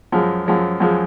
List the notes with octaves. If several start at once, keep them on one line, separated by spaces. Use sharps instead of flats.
F#2 F3 G#3
F#2 F3 G#3
F#2 F3 G#3